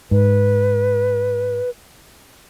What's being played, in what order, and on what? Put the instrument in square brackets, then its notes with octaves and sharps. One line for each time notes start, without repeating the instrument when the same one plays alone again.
[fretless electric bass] G#2 [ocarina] B4